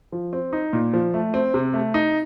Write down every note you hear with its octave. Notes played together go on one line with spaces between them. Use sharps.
F3
C4
D#4
A#2
F3
A3
C4
C3
A3
D#4